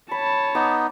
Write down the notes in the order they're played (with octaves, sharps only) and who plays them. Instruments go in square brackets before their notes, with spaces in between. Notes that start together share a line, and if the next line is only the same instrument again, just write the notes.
[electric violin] C#5 A5 [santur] B5
[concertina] B3 D#4 [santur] D6